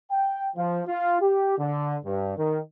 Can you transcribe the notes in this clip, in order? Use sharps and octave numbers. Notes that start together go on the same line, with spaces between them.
G5
F3
F4
G4
D3
G2
D#3